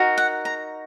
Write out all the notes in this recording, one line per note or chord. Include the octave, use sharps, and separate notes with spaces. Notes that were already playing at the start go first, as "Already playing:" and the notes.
Already playing: D#4 F#4 A#4
F#5
A#5